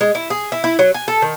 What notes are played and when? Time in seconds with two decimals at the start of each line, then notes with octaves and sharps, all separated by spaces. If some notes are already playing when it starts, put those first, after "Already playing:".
0.01 G#3
0.15 E4
0.30 G#4
0.52 E4
0.64 E4
0.79 F#3
0.94 G#5
1.08 A4
1.22 D#3